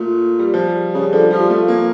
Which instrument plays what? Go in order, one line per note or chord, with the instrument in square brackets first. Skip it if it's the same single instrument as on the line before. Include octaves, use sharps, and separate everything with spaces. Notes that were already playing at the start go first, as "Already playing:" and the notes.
Already playing: [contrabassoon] A#2 [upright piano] A3
[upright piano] G3
F3
G3
[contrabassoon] C#3 [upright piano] G3
[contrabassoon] D3 [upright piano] F3
[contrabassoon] F3 [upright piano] G3
[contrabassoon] F3 [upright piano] A3
[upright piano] A#3